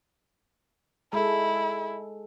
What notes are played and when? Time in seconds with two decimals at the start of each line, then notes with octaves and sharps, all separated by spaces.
1.13 G#3 E4 A4